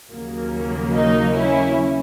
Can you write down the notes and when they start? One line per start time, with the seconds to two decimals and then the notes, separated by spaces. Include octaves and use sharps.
0.11 D#2 C#3 F#3 A#3
0.93 D#4
1.34 C#4 E4